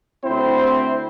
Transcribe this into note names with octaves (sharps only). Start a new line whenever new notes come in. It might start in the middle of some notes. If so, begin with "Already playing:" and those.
D2 C4 E4 C5